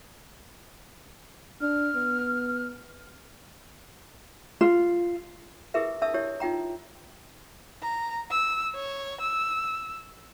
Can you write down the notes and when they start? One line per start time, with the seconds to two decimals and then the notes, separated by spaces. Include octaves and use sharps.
1.61 D4 F6
1.95 B3
4.61 F4
5.74 E4 G4 G#4 A#4 B4 E5
6.02 D4 E5 A5 D#6 E6
6.14 E4 G4 C#5
6.40 D#4 F4 G5 A#5
7.82 A#5
8.31 E6
8.75 C#5
9.21 E6